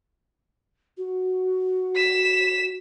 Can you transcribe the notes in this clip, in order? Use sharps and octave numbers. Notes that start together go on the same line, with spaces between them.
F#4
B6 E7